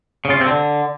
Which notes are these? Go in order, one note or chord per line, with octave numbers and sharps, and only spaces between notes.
C#3
F4
C3
C4
D3